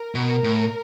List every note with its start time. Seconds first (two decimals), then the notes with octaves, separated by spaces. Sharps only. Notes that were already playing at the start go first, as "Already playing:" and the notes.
Already playing: A#4
0.15 B2
0.44 A2